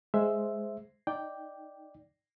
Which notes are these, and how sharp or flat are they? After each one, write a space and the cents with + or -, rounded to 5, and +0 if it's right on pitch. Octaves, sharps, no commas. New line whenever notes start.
G#3 +10 C5 +0 E5 +0
D#4 +0 D5 -5 G5 +0